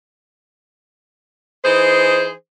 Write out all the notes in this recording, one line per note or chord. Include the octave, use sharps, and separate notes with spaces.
E3 D#4 G#4 C5